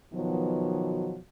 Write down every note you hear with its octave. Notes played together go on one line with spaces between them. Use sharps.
B2 D#3 F3 F#3 B3